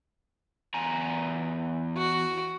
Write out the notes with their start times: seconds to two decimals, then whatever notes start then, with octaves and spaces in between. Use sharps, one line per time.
0.74 E2 G#5 A#5
1.97 F#4